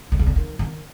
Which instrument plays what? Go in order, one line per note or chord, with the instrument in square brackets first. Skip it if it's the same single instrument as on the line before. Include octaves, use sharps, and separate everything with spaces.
[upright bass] D3
C3
D3
D#3
D#3